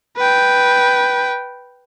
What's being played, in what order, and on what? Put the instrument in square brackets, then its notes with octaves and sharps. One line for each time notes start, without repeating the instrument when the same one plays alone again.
[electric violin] B4 G5